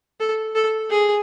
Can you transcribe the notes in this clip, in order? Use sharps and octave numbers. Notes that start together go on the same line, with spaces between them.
A4
A4
G#4